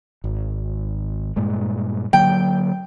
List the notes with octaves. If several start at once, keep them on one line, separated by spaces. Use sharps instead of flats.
G#1
G2 A#2 G#3
D3 F#3 A#3 G5